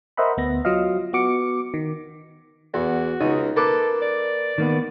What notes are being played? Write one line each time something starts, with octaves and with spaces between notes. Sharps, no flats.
A#4 C5 D#5 E5 F#5 B5
D2 B3 A#6
F#3 F4 D#5 F5
B3 F#4 D6 C#7
D#3
E2 F#4
C#2 D#4
A#3 A4 B4 D6
D5
D#3 A#3 B3